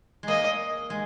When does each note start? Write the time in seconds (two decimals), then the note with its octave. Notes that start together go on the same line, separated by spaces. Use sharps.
0.23 G#3 A#3 D#5
0.90 G#3